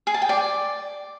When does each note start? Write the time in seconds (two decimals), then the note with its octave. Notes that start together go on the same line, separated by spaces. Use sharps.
0.07 G#4
0.14 A5
0.22 G5
0.29 D5